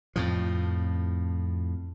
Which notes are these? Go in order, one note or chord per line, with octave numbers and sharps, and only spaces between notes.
F2 A2 F3